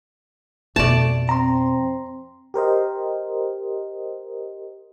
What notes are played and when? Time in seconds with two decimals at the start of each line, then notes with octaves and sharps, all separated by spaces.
0.76 F2 B2 A3 D5 A5
1.29 C4 A#5 C6
2.54 G4 A#4 C5 D#5